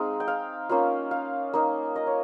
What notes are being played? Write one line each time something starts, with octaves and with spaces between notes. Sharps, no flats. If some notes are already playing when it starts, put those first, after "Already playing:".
Already playing: G#3 C4 D#4 F5
G5
F5
A#3 C#4 F4 F5
F5
A#3 D#4
D#5
C#5